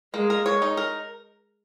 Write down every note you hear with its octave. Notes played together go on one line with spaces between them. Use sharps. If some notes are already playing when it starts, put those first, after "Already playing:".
G#3 A#3
A#4
C#5
D#4
A#4